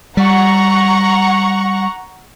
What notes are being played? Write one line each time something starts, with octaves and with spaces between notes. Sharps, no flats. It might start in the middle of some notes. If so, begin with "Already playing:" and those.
G3 F#5 A#5 C#6